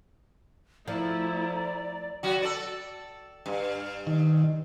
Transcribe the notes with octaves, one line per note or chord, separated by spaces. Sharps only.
F3 A3 E4 D5 A#5
F#3 F#4
A4 D5
G2
D#3